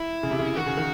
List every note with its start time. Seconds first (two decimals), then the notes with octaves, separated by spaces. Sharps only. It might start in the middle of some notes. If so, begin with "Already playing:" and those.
Already playing: E4
0.23 C#3
0.31 C3
0.39 C#3
0.56 D#3 F#4
0.66 C#3
0.77 D#3